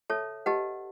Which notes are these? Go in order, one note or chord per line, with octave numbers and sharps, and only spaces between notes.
A4 C#5 E5 A5
G4 B4 D#5 F#5 A5